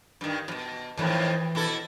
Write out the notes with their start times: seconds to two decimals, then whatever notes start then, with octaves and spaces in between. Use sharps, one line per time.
0.21 G2 D#3
0.48 F2 B2
0.98 F2 A2 D#3 E3 A5
1.55 B2 E4 A4